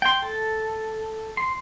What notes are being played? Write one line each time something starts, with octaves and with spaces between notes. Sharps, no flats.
G5 C6
A4
C6